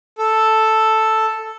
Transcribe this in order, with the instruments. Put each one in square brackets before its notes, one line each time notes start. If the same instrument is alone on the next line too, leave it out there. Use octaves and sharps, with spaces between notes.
[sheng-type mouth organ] A4